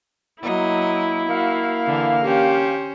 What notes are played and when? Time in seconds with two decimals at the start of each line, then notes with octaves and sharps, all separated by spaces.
0.42 F#3 A#3 E4 D#5
1.29 A#3 F#4 F5
1.86 D3 E3
2.24 C#4 G4 C5